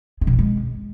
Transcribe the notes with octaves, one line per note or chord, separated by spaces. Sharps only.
G#3
B2
F#3
G#3